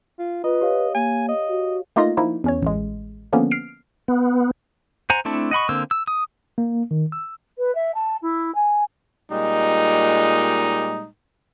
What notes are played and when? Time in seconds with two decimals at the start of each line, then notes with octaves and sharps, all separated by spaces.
0.19 F4
0.44 F4 B4 D#5
0.61 G4 C#5 F5
0.95 A#3 G#5
1.28 D#5
1.49 F#4
1.96 A3 A#3 D#4 F4 D#5 A#6
2.17 F3 A#3 D#4 E4
2.44 E2 C#4 C#5
2.62 A1 G#3
3.33 D3 F3 A#3 B3 C#4
3.51 F6 C7 D7
4.08 B3
5.10 C5 F#5 G#5 A#5
5.25 A3 C4 D4 E4 A4
5.51 D#5 F#5 B5 C#6
5.69 D3 A#3 C4 E6
5.91 E6
6.07 D#6
6.58 A#3
6.91 D#3
7.12 E6
7.57 B4
7.74 E5
7.94 A5
8.22 E4
8.54 G#5
9.31 A#2 G3 G#3 D#4